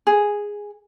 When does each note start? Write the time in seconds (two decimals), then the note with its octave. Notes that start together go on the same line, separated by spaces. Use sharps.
0.07 G#4